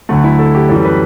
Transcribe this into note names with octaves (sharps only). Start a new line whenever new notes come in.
D2 D3 F#3 A3 F#4
E4
A4
G4
F#2 E3 G3 A4
B4